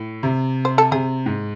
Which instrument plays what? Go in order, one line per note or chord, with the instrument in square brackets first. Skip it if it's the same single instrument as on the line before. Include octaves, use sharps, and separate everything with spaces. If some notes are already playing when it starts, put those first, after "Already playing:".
Already playing: [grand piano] A2
C3
[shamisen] C5
A4
[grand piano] C3 [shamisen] G#4
[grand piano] G#2